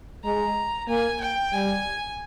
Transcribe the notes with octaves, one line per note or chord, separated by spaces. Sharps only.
G#3 A#5
A#3 G#5
G5
G3 G#5